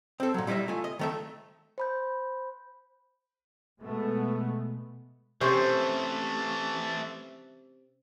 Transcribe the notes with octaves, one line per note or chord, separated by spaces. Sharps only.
C4 A4
A#2 F#3
G3 E4 F4 D#5 E5
A3 F4 G#5
D#5
D#3 A3 E5
C5 B5 G6
B2 G#3 A3 B3
C3 E3 A3 C#4 C5